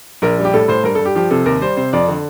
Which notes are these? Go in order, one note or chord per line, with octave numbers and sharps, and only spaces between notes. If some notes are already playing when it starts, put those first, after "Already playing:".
A#1 A#4
G3
G4
A2 A4
A2 C5
G2 A#4
A4
G2
G4
F3 G4
C3 A4
D#2 A#4
G3 C5
C3 C5
F2 D5
D3